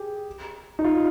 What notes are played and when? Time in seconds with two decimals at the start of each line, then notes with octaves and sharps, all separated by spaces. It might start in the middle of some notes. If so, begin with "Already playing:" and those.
Already playing: G4 G#4
0.79 D#4
0.84 F4